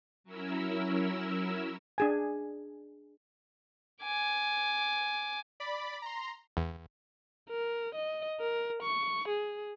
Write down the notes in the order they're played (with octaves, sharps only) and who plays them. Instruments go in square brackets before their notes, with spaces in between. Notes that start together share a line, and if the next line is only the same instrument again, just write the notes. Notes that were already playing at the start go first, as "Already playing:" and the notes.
[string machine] F#3 C#4 E4 A#4 E6
[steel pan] D4 G#4 G#5
[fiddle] G#5 D6
[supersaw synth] D5 B5
A#5 C6
[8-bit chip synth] E2
[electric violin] A#4
D#5
A#4
C#6
G#4